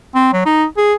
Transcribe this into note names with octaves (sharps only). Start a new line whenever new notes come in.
C4
F#3
D#4
G#4